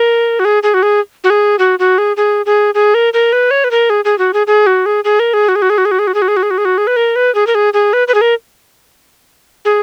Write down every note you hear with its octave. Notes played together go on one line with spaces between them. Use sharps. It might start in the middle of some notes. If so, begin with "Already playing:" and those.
Already playing: A#4
F#4
G#4
G#4
F#4
G#4
F#4
G#4
F#4
F#4
G#4
G#4
G#4
G#4
A#4
A#4
B4
C#5
B4
A#4
G#4
G#4
F#4
G#4
G#4
F#4
G#4
G#4
A#4
G#4
F#4
G#4
F#4
G#4
F#4
G#4
F#4
G#4
F#4
G#4
F#4
G#4
F#4
G#4
F#4
G#4
F#4
G#4
B4
A#4
B4
G#4
A#4
G#4
G#4
B4
B4
G#4
A#4
G#4